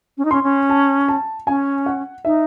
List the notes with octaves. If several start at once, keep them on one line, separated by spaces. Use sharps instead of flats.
C#4
D#4
C#4 C6
C#4
A5
A5
C#4 G#5
F#5
D#4 E5